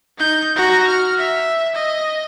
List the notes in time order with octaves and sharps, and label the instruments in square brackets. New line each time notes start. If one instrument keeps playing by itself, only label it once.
[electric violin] D#4 G6
F#4 A#5
F6
E5
D#5